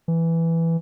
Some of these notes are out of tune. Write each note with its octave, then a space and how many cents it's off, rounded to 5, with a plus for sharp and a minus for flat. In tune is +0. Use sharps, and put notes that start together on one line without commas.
E3 +5